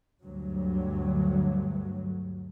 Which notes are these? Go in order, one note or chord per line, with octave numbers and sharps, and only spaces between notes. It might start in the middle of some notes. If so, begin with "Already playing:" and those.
D2 G2 F#3